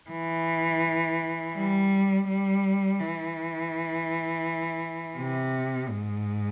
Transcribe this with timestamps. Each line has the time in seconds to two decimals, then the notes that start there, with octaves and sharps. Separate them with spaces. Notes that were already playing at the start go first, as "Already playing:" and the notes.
0.11 E3
1.56 G3
2.28 G3
3.00 E3
5.18 C3
5.90 G#2